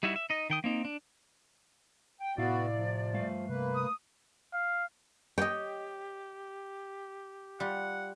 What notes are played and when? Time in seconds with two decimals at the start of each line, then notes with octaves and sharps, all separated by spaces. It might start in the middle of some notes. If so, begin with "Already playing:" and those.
0.03 G3 D#4 E4 F#4 E5
0.16 E5
0.30 D#4 D#5
0.50 D#3 G5 D#6
0.64 A#3 C4 D#4
0.85 D4
2.21 G5
2.38 A2 C3 B3 E4 F#4 D5 F5
2.75 F3
3.13 G2 A3 F5
3.49 C3 A#3 B4
3.75 D#6
4.53 F5
5.38 G4 C#5 D#5 G5
7.60 G3 F4 F#5